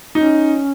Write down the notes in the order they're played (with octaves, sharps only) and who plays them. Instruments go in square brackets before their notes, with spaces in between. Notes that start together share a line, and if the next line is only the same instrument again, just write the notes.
[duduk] C#4 [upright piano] D#4